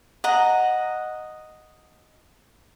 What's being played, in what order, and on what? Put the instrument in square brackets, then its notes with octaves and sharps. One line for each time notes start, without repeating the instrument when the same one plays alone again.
[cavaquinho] D#5 F#5 A#5